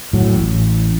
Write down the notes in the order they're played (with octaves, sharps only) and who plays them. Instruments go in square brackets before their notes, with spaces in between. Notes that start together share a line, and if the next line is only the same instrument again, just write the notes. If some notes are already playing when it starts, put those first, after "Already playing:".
[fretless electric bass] A2 F#3
A1